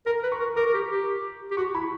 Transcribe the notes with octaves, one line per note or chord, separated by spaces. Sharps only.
A#4 A#5
B4
C#6
A#4
A#4 D6
A#4
G4
G4
G4
F#4 C#6
E4 B5